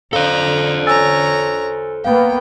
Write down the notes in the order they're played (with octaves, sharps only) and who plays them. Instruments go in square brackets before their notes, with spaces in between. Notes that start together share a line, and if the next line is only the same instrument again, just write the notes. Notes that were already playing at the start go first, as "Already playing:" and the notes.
[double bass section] D3 [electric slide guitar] A4 C5 [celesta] F5 [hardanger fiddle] A#5
[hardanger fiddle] C#5 A#5 [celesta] G#5 E6 A6
[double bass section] A#3 B3 [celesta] F5 [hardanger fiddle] G5